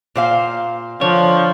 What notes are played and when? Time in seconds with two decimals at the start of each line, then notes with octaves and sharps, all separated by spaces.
0.15 A#2 C5 F5
1.01 D3 F3 C#5